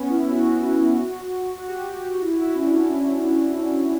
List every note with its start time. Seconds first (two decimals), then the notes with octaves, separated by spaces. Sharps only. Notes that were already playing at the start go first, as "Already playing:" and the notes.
Already playing: B3 C#4
0.10 E4
0.31 F#4
1.58 F#4
1.68 G4
1.79 F#4
2.14 F#4
2.21 E4
2.32 F#4
2.42 E4
2.55 C#4
2.63 D4